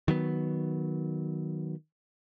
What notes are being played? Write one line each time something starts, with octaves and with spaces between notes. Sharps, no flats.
D#3 F#3 B3